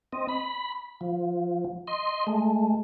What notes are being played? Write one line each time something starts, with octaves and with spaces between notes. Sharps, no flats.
C4 D#5
B5
F3
D#5 C6
G#3 A3